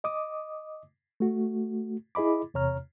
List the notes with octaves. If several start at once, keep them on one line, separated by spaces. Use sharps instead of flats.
D#5 D6 D#6
A3 F#4
E4 G#4 D#5 B5 D6
E2 C3 C#5 A#5 F6